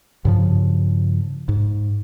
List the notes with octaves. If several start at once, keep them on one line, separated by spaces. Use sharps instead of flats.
G2 C#3 F3
G#2